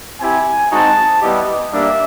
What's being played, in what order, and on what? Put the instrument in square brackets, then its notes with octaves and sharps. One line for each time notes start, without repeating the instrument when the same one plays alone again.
[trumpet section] C4 E4 G4 G#5
G#3 C4 D#4 F#4 A5
G3 B3 E4 G4 D#5
G3 A#3 D4 G4 E5